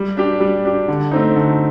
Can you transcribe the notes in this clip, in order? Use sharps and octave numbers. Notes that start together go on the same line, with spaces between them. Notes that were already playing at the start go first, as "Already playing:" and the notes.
Already playing: G3
D4 G4
G3
D4 G4
D3
A3 C4 D#4
D3